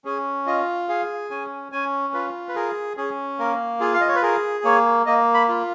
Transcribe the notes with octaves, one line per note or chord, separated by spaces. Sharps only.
C#4 G#4
F4 D#5
G#4 F5
C#4 G#5
C#4 G#5
F4 B4
B4
G#4 A#4
C#4 G#4
A#3 A#4
F4 G#4
F5
D#5
C#5
B4
G#4 A#4
A#3 C#5
A#3 D#5
B5
F4